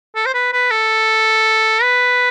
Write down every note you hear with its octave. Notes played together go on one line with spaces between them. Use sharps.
A4
C5
B4
B4
A4
B4